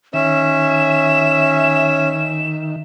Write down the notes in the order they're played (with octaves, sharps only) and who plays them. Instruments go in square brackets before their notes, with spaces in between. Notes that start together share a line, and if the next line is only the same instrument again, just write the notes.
[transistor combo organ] D#3 [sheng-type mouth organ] C#4 [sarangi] E5 [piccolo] E7